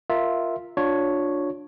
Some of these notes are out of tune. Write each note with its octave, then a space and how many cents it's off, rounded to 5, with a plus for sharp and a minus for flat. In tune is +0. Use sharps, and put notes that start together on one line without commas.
F4 +0 A#4 +0 E5 -10
D4 +0 F4 +35 C#5 +0